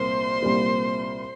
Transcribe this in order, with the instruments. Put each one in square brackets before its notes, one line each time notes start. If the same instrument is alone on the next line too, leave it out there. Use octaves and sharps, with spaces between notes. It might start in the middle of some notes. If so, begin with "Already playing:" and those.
Already playing: [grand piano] C2 A#2 G3 A#3 [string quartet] C5 C6
[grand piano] C2 A#2 G3 A#3